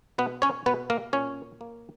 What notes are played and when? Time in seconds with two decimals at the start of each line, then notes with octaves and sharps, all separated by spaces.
0.18 B2 B3 B4
0.42 C#4 C#5
0.66 B2 B3 B4
0.90 A#3 A#4
1.13 A#2 C#4 C#5
1.61 A#3